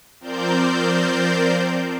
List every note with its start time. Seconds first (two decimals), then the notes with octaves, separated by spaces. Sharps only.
0.20 F3 C4 A#4 C5 D5 G6